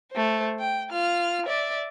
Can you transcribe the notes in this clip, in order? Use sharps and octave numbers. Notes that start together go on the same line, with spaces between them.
A3 C5
G5
F4 F6
D5 E5